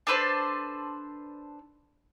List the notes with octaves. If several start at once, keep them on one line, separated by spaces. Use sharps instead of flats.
D4 A4 B4 C5